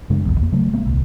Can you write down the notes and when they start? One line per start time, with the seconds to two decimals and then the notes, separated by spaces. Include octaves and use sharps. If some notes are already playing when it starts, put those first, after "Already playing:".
0.10 F#2 C#3 G#3 D4
0.25 F#1 B1 E2
0.40 F2 A#3
0.52 C#3 F#3 A3
0.73 A1 G#3 A#3 C4
0.85 D#1 C2